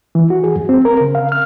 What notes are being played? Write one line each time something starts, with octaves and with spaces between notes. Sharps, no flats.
E3
F#4
G#4
F#2
C4
A#4
C#3
F5
F6